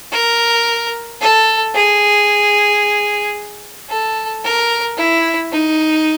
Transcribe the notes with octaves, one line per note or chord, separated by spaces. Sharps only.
A#4
A4
G#4
A4
A#4
E4
D#4